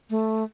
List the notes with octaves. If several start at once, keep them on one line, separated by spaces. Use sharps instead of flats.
A3